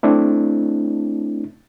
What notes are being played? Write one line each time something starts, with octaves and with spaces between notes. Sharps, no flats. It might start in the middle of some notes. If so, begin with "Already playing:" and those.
A3 C4 D4 E4